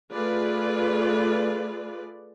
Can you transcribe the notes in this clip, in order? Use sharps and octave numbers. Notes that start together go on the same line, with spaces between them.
A3 F4 G#4 B4 D5